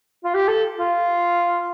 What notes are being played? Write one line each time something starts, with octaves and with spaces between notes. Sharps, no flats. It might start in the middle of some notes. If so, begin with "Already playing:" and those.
F4
G4
A4
F4